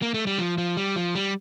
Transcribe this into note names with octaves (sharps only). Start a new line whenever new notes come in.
A#3
A3
G3
F3
F3
G3
F3
G3